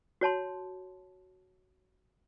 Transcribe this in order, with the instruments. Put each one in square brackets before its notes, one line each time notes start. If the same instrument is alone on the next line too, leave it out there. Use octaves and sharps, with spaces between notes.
[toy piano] F#4 C#5 A5 C6